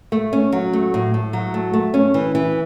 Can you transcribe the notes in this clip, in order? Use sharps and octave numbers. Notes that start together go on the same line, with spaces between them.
A3
C#4
F#3
A3
A2
A2
F#3
A3
A3
C#4
E3
E3